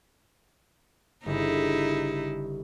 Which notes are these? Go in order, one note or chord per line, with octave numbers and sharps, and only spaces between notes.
G1 C#3 D#4 E4